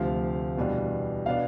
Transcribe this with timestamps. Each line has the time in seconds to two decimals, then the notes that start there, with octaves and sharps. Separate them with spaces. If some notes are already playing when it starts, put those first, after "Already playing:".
Already playing: D2 C3 F3 F5
0.57 E2 B2 G3 D4
1.26 B2 B3 D4 F5